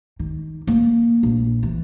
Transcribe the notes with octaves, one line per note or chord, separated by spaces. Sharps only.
D#3
A#3
A#1
E3